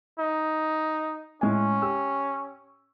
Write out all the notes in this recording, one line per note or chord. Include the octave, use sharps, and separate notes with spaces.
D#4
A2 G#3 C#4 G#5
G4 E6